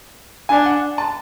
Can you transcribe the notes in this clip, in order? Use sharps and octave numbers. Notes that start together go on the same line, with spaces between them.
D4 G#5
F#5
A5